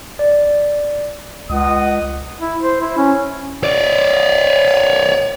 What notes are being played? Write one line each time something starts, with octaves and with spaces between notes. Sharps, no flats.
D5
C#2 D#5 F#5 D#6
E4
C5
E4
C#4
C#5 D5